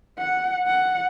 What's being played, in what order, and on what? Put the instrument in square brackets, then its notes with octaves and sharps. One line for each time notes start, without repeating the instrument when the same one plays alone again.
[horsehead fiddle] F#5
F#5